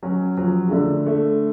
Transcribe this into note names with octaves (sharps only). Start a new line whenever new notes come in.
F#3 C#4
F3 F#3
C#3
D3 A3
A3